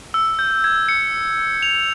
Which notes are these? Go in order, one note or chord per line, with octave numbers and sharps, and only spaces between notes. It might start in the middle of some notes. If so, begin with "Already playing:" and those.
E6
G6
G#6
C#7
F7